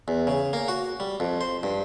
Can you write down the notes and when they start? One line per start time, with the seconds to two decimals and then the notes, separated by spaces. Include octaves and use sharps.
0.08 E2
0.27 C#3
0.53 A#3
0.68 F#4
1.00 G3
1.20 F2
1.41 C5
1.63 G2